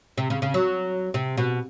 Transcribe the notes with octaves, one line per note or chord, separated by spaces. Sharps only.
C3
C#3
C#3
F#3
C3
B2